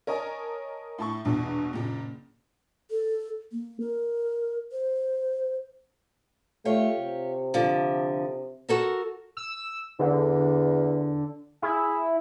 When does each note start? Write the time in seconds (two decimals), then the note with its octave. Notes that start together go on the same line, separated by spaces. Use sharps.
0.07 A#4 C#5 D#5 G#5 A5
0.98 A2 A5 C#6
1.25 A#1 E2 G2 B2
1.73 F#1 A#2
2.90 A4
3.52 A#3
3.80 A#4
4.72 C5
6.65 A3 F4 G4 C#5
6.98 C3
7.54 D3 F3
8.69 F#4 A4 A#4
9.37 E6
9.99 E2 D3
11.62 E4 G#4